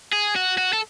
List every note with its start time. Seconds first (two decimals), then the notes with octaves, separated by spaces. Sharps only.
0.13 G#4
0.36 F#4
0.58 F#4
0.73 A4